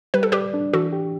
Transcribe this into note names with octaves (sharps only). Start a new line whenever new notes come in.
G3 B4
A4
G4 B4 D5
D4
E3 F#4 A4
G4